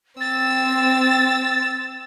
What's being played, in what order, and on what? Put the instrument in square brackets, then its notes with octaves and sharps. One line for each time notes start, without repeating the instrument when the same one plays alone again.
[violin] C4 E6 [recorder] A6